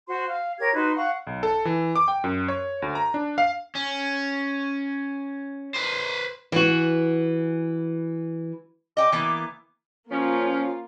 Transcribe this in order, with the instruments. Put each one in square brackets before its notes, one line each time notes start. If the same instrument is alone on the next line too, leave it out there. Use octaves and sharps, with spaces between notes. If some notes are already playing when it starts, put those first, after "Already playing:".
[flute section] F#4 C5 F#5 C6
F5
G4 A#4 C#5 G#6
D#4 F#4 B4 C6
F5 F#5 C#6
[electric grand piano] B1
A4
E3
D6
G5
F#2
C#5
D2
A#5
D4
F5
[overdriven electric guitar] C#4
B4 C5
[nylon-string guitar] E3 F#4
[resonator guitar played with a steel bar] D#5 G5 [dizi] D6
[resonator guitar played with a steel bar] E3 A#3 B3
[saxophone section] F3 C#4 [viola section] A#3 F4